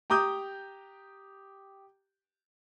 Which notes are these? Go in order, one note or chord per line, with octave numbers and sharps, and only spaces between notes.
G4 A#5 D6 D#6 G6